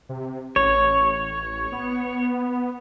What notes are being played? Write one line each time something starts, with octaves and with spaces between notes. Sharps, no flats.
C3
A1 C#5
B3